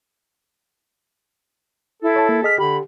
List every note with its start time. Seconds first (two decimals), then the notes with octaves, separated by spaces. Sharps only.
2.02 E4 A4
2.16 C#5 A5
2.29 A#3
2.43 G#4 D#5 F6 B6
2.58 D3 G4 B5